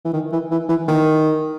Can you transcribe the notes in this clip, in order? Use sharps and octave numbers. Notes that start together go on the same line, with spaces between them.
E3
D#3
E3
E3
E3
D#3